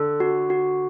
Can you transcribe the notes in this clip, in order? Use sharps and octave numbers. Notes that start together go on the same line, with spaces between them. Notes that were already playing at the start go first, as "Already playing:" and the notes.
Already playing: D3 A4
F#4
F#4